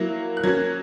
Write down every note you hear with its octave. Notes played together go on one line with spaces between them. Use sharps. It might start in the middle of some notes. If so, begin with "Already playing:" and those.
Already playing: F#3 A#3 E4
F#6
F#3 A#3 C#4 G#6